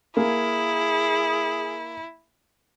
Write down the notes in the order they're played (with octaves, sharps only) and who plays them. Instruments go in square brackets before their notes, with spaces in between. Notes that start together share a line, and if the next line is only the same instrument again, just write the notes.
[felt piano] A#3 [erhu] E4 [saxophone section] G#4